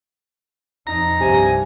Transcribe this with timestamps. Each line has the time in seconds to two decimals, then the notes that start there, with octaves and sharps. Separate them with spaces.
0.87 F2 D#4 A#5
1.20 C2 G2 C3 G#5